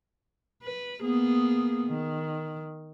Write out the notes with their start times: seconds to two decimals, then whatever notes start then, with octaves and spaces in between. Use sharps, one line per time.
0.63 B4
1.02 A#3 B3 G#4
1.87 D#3